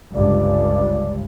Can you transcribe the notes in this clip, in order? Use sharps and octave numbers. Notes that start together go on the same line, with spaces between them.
G1 C#2 G2 D5